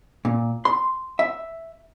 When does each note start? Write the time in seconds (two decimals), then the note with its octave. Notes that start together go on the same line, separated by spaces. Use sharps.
0.25 A#2
0.65 C6
1.19 E5